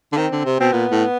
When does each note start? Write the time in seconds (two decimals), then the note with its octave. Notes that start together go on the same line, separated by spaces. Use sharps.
0.12 D3
0.17 D#3 C4
0.32 D3
0.45 C3
0.59 B2 C4
0.72 A#2 B3
0.91 A2